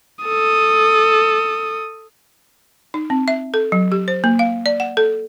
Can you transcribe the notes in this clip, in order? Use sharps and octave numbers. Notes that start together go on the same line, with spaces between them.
A4 D#6
D#4
C4
E5
A4
F#3
G4
C5
A#3
F5
D5
F#5
A4